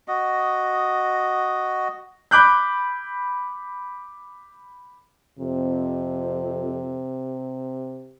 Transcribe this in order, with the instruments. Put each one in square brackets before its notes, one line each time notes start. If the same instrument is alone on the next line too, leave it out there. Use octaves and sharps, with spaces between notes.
[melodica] F#4 D#5
[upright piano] B5 D6 F#6 G6
[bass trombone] F2 [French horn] C3